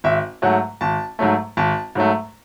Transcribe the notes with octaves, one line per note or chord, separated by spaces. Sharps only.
G#1 E5
G#2 F#3 A3 F#5
G#1 A5
G#2 F#3 A3
G#1 A5
G#2 F#3 A3